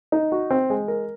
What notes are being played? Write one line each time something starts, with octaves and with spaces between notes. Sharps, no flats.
D#4
F#4
C4
G#3
A#4